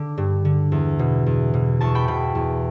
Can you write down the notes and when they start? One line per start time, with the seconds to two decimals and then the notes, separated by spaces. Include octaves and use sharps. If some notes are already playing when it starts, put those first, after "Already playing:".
Already playing: D3 D6
0.18 G2
0.45 D3
0.72 E2
0.99 B2
1.26 E2
1.54 B2
1.80 E2 A5 C#6
1.95 G5 B5
2.08 B2 G5 B5
2.35 E2